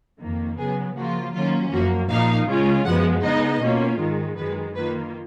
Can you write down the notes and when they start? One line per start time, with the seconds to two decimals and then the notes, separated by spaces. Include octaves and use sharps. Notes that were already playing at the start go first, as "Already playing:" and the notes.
0.20 F2 D#3 A#3
0.58 C#3 F#3 B3 G#4
0.96 C#3 F3 A#3 F4 F#4
1.34 D#3 F#3 A#3 C#4 F4
1.72 F#2 F3 A#3 F#4
2.10 A#2 F3 A#3 D#4 F5
2.47 C#3 G#3 C#4 F4
2.85 F#2 F3 G#3 B3 F#5
3.23 C#3 G#3 B3 D#4 D#5
3.61 B2 A#3 C#4 F4
3.99 G#2 D#3 G#3
4.37 F#2 D#3 G#3 B4
4.75 D#3 A#3 F4 B4